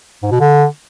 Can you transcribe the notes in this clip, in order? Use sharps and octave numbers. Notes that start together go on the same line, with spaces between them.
G#2
B2
D3